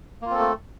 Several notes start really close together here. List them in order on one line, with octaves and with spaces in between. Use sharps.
A#3 F4 C4 A4 A3